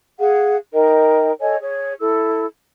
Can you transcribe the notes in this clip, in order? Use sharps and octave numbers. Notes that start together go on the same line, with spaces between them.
G#4 F5 F#5
D#4 A#4 D#5 G5
A4 C#5 D#5 G#5
G#4 C#5
E4 A4 E6